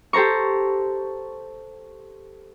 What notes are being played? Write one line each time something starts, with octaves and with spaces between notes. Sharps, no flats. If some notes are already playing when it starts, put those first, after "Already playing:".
G4 A4 C5 A#5 C#6